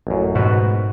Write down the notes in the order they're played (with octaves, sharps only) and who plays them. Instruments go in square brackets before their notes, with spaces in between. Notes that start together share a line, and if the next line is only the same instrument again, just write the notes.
[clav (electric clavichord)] A1 F#2
[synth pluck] G#2 B2 [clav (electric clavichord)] F#4 B4